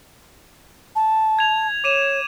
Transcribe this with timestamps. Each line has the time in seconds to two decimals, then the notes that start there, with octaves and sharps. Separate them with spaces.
0.95 A5
1.39 G#6 F7
1.84 C#5 D6 D#7 E7